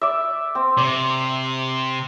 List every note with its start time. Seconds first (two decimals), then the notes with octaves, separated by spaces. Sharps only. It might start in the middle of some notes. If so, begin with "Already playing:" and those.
0.01 D5 E5
0.55 C4
0.77 C3 D5